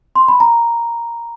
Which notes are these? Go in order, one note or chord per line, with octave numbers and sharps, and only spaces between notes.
C6
B5
A#5